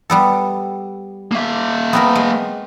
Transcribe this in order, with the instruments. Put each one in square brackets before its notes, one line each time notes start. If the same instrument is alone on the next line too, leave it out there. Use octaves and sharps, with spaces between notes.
[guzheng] G3 B3 A4
[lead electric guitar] A#3 E5
[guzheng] B3 C4 A#4
G#3